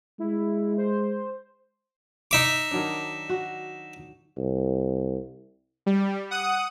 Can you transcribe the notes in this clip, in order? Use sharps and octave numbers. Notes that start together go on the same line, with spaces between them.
G#3 E4
C5
D#4 E5 D6
D#3 F#3 D4
F#4
C2
G3
F#5 D#6